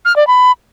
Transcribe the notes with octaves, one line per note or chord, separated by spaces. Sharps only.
F6
D5
B5